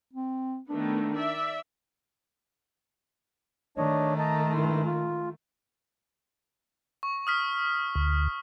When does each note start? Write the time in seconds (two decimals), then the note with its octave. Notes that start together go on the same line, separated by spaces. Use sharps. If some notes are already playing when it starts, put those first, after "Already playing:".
0.13 C4
0.69 D#3 A3 B3 D4
1.16 D5 E5
3.78 D#3 A3 D4 C#5 D#5
4.19 D#5 A5 A#5
4.54 G2 E4 C6
4.85 F4
7.03 C#6
7.27 D#6 F6 B6
7.95 D2